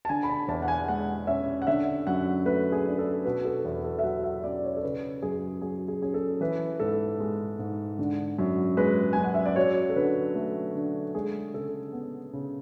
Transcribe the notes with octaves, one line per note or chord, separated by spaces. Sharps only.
A5
D3 G#5
B5
A5
E2 A5
F#5
G#5
G#3 F#5
C#4 E5
F#5
D3 E5
F#2 F#5
A3 B4
G#4
D4
A4
B2 B4
A4
E2
A4
E5
F#3 F#5
E5
C#4 D5
C#5
A4
C#3 B4
F#2 G#4
F#3 G#4
G#4
C#4 G#4
A4
E3 B4
G#2 A4
G#3
G#2
D3
F#2
G#3 B4
F#2 G#5
F#5
E5
D5
F#3 C#5
A4
D3 B4
A3
D3
G#3 G#4
C#3 A4
B3
C#3